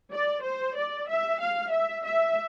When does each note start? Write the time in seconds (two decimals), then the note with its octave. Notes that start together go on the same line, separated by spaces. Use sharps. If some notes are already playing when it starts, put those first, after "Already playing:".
0.12 D5
0.43 C5
0.76 D5
1.08 E5
1.40 F5
1.72 E5
2.04 E5